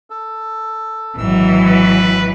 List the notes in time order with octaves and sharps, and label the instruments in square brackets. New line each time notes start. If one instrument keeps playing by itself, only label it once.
[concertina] A4
[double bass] G#1 [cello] E3 F#3 [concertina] E6
[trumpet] B4